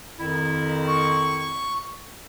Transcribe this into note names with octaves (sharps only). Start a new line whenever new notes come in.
F2 D#3 E4
C#6